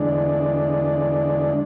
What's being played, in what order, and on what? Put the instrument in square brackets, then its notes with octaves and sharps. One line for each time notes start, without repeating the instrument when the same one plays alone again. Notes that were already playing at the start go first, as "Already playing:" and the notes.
Already playing: [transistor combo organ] E2 D3 G#3 D4